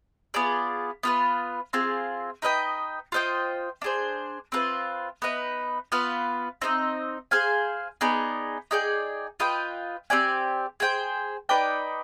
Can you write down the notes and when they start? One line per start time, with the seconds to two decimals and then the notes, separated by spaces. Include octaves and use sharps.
0.34 B3 F4 G#4 D5
1.03 B3 F4 B4
1.73 C4 F4 G#4
2.42 D#4 B4 D#5 G5
3.12 F4 C5 D#5 G5
3.82 D4 G#4 C5
4.52 C4 F4 B4
5.22 B3 D#4 B4
5.92 B3 F4 B4 F5
6.61 C4 D#4 B4 D#5
7.31 G#4 C5 F5 G#5
8.01 B3 D#4 G#4 D5
8.71 D#4 G#4 D5 G5
9.40 F4 B4 D#5 G5
10.10 C4 G4 D5 G#5
10.80 G#4 C5 G5
11.49 D#4 B4 D5 G5